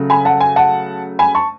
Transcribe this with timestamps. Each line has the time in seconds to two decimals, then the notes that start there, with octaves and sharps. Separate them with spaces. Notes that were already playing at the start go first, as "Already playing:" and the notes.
Already playing: C#3 F#3 A3
0.10 G#5 B5
0.25 F#5 A5
0.40 G#5
0.56 F#5 A5
1.19 G#5 B5
1.35 A5 C#6